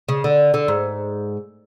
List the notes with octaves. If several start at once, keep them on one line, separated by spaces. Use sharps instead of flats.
C#3
D3
D3
G#2